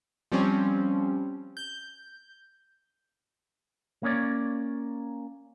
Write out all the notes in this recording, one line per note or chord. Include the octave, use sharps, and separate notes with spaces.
F3 G3 C4 C#4
G6
A#3 C#4 C#5 D5